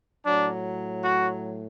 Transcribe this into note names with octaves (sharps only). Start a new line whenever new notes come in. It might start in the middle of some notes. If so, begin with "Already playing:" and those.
A2 F#3 D4
F#4